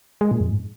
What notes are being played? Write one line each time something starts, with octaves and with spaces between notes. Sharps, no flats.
G#3
A#2
F2
G#2